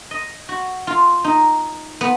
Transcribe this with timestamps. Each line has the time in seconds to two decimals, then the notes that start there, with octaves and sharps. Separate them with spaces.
0.11 D#5
0.49 F#4
0.87 F4
1.24 D#4
2.01 B3